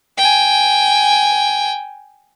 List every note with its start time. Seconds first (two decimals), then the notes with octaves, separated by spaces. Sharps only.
0.18 G5 G#5